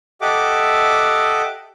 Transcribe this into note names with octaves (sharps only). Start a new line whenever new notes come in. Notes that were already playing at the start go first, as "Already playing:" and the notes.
G4 A4 D#5 E5 F#5 D6